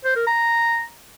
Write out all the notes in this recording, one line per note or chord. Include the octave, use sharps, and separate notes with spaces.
C5
A#4
A#5